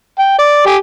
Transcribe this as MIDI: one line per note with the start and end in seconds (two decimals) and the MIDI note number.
0.19 0.35 79
0.39 0.64 74
0.66 0.76 67
0.66 0.76 80